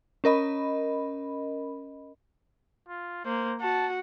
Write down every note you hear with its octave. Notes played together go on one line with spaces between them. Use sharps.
C#4 A#4 D#5 B5
F4
A#3 C5
F#4 A5